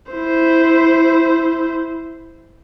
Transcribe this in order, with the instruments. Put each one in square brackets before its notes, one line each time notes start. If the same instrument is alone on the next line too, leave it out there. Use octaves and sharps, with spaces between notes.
[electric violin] E4 C5